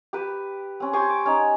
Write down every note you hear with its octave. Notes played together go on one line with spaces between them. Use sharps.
G4 B4
C4 C#4
G4 G#5 C6 C#6
D6
C#4 D#4